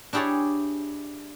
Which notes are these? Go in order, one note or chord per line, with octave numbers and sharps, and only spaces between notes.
D4 E4 G4 G#4 C#5 D5